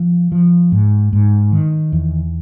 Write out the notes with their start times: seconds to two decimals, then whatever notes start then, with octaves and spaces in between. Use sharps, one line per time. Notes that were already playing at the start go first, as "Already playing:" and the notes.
Already playing: F3
0.32 F3
0.72 G#2
1.13 G#2
1.52 D#3
1.92 E2